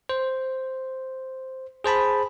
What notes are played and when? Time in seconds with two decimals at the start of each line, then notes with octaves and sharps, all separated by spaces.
0.09 C5
1.84 G#4 C5 A5 B5